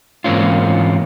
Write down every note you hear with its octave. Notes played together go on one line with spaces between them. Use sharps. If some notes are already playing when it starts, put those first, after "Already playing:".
G#2 E3 A#3 C4 C#4 F4